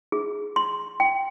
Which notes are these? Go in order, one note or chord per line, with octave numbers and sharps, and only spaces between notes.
G#4
C6
G5